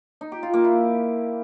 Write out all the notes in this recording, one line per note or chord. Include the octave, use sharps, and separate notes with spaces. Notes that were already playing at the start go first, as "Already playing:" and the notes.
D#4
G4
F4
A#3
E4